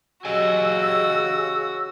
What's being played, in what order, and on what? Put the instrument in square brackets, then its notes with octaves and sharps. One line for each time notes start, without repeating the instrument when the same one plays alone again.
[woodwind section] C#3 E6 [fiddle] F#4 [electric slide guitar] G4 D#5 G#5